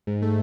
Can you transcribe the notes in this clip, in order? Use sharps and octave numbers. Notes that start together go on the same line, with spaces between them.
G#2
A3